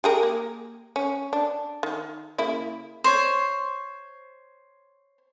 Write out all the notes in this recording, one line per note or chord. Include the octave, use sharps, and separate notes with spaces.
G4 G#4 A#4
A#3
C#4
D4
D#3
C#3 A#3 E4
C5 C#5